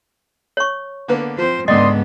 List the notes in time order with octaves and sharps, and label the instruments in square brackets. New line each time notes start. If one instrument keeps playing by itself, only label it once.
[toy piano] C#5 C#6
[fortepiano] D3 A#3 B3
[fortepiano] F3 C4 [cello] C5
[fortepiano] C#2 D3 [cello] G#2 B3 [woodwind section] D5 C6 D#6 [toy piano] D#5